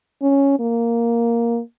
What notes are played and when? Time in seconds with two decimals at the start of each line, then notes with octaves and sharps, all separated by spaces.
0.22 C#4
0.59 A#3